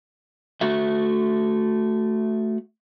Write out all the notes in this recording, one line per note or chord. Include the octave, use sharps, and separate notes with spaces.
A3 F#4 E5